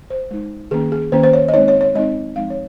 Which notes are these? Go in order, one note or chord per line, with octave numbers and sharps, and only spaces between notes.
C5
G#3 D#4
D#3 A#3 C#4 G#4
G#4
D#3 A#3 C#4 C5
C5
C#5
D#5
G#3 C4 D#4 C#5
C#5
C#5
G#3 C4 D#4 D#5
F3 G#3 C4 D#4 F5
C#5